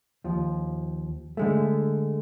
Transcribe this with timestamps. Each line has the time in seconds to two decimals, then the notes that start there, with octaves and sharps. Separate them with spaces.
0.24 D#2 F3
1.37 D3 G#3 A3